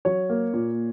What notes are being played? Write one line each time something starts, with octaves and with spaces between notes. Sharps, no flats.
F#3 C#5
A#3
A#2